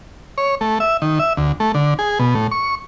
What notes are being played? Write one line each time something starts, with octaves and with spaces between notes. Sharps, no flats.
C#5
A3
E5
D#3
E5
D2
A3
D3
G#4
B2
A2
C#6